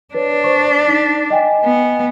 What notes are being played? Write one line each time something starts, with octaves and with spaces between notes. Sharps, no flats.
D4 B4 C#5
C5 C#6
D#4 B6
D#5 G5 G#5
B3